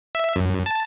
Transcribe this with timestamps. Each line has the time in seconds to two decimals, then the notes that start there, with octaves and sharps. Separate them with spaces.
0.15 E5
0.36 F#2
0.66 A5